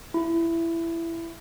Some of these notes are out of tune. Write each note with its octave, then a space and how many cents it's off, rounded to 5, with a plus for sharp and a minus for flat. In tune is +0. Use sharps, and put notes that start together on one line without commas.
E4 +15